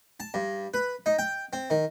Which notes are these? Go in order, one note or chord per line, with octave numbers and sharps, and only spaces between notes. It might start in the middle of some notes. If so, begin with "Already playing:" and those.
A5
G2
B4
D#4
G5
C4
D#3